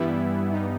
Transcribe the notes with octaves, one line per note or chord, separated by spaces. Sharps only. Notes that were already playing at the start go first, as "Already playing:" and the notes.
Already playing: G2 E3 G3 B3 E4
G2 E3 G3 B3 D#4